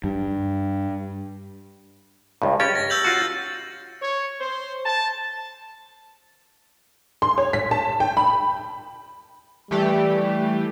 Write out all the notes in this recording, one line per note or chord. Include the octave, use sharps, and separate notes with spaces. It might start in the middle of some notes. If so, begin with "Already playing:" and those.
G2
C#2 G2
C#4 G4 A6
A#6
E6 G6 F#7
F4 F#4
C#5
C5
A5
C6
C#5
B6
A5
G5
B5
E3 G3 A3 G4